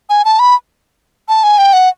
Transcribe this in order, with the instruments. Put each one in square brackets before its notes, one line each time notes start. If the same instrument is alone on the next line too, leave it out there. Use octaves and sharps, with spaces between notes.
[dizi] G#5
A5
B5
A5
G#5
G5
F#5